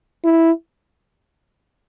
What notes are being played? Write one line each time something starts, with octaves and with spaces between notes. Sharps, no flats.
E4